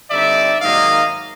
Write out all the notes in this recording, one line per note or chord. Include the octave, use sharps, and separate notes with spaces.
D3 G3 C4 D#4 D5 E5
G#2 D#3 F#3 A#3 D#4 D#5 F5